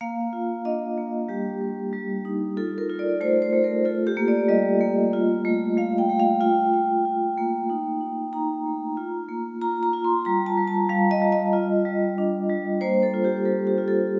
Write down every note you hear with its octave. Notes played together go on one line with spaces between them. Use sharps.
A#3 F5
F4
D4 D#5
A#3
G3 G4
G3
G3
D#4
F4 A4
A#4
F4
D5
A3 C5
C5
A3
A#4
F4 A4
G4
A#3
D5
G3 D#5
A#3
F4
A3
A3 F5
G5
A3
F5
F4 G5
F4
F4
A#3
D#4
D#4
D#4 A#5
A3
F4
A#3
F4 A#5
A#5
F4
C6
G3 A#5
A5
G3
A5
G3 F5
D#5
G3
D#5
F4
G3
D4
G3
A#3 C5
A4
F4
G4
G3 A4
G4
F4
A4